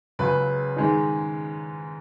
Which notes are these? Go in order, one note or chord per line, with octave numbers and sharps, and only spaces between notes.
C#2 C#3 F#3 B4
G#2 D#3 G#3 D#4